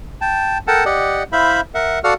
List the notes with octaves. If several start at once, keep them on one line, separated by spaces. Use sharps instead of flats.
G5 A5
A4 A#4 F#5 G5 A5
G4 D5 D#5 F#5
E4 C5 E5 F5 B5
A#4 E5 F#5
F#4 A4 D5 F5 F#5 F6